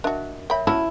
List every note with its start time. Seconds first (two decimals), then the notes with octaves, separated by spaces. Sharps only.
0.04 D4 F#4 A#4 D#5 E5
0.50 A#4 C#5 E5 G5 B5
0.67 C#4 E4 F#4 A5 B5 E6